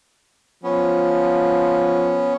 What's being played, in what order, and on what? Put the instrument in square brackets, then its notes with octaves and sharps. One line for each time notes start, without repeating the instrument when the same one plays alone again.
[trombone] F3 [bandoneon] B3 C#4